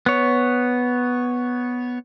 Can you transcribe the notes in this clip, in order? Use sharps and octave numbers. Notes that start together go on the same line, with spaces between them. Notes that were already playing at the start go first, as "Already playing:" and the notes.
B3 C#5